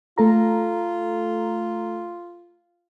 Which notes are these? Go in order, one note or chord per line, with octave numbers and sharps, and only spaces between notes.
A3 F4 A4 A#5